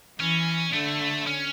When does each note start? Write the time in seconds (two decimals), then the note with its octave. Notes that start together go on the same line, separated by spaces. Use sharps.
0.20 E3 C#4
0.74 D3 A3
1.27 C#4